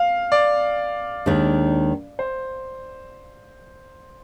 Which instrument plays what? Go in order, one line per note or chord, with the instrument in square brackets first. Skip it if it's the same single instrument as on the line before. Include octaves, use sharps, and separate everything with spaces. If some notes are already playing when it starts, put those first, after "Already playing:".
Already playing: [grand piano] F5
D5
[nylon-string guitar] D#2 D#3 G#3 D4
[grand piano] C5